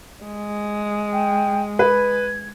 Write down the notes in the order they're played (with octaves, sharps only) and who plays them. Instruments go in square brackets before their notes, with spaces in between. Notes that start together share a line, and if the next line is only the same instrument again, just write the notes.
[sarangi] G#3
[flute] G5
[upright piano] B4 [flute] G#6